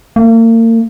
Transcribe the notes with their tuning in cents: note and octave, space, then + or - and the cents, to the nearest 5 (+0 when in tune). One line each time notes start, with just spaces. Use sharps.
A#3 -40